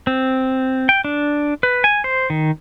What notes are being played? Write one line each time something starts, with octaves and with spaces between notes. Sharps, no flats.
C4
G5
D4
B4
G#5
C5
D#3